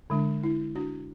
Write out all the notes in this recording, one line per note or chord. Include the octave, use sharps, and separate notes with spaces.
D3 G#3 D4
E4
D4 F#4